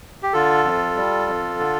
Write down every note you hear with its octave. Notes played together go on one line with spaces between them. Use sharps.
G4
D3 F4 A4
F2
G3
F2
D3